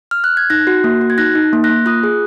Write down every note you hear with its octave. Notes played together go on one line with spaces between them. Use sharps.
F6
F#6
G#6
D#4 F#6 A#6
F#4
A#3
F#4
G#6
D#4 F#6 A#6
D#4
A#3
F#6 A#6
A#3
F4 D#6 F#6
G#4